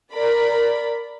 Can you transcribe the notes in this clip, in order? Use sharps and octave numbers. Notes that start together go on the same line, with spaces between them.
A#4 D5 B5